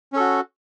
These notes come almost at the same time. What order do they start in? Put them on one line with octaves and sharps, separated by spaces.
C#4 A4 F#4